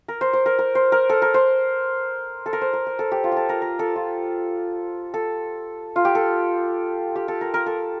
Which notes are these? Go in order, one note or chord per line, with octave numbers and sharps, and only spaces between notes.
A#4
C5
C5
A#4
A#4
C5
A#4
A4
A#4
C5
A4
A#4
C5
A#4
A#4
A4
G4
F4
G4 A4
A#4
A#4
A4
F4
A4
F4
G4
A4
G4
A4
A#4
A#4
A4